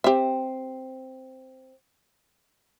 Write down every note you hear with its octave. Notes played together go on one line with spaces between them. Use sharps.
C4 G4 E5